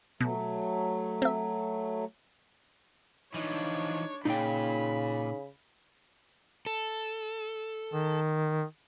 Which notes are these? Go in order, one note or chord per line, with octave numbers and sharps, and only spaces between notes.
B2 F#3 A3
C4 E5
E3 F3 D4 D#4 C#5
A#2 C#3 D#4 G5 B5
A4
D#3